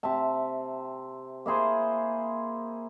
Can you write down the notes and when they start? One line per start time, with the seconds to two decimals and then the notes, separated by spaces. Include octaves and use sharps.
0.03 C3 E5 A5
1.46 A#3 E4 G#4 C5